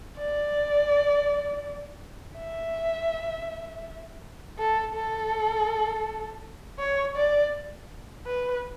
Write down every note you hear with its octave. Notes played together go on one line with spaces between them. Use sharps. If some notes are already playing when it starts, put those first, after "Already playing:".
D5
E5
A4
A4
C#5
D5
B4